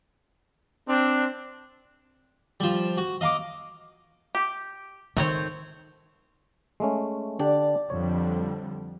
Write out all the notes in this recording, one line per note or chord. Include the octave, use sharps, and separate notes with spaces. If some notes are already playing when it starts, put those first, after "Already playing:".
C4 D4
F3 G3
F#4
D#5 F5 A#5 D6
G4
D#3 A3 C4 C#5
G#3 A3 C#4
D3 D4 G4 D5
F2 D3 G3 C#5